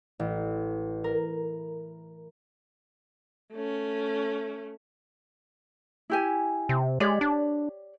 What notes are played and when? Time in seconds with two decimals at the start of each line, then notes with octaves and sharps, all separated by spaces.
0.20 A1
1.04 A#4
3.52 A3 C#4
6.10 E4 G4 G#5
6.69 C3
7.00 G#3 G4 C#5 D5
7.21 D4